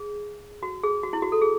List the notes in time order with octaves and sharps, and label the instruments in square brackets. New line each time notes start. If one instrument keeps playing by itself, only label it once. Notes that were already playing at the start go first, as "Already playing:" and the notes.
Already playing: [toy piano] G#4
F#4
G#4
F#4
E4
F#4
A4
G#4